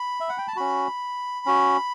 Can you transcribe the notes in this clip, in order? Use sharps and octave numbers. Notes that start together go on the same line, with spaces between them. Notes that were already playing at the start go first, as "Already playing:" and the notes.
Already playing: B5
E5
F#5
G5
A5
C#4 F#4 B5
C#4 F#4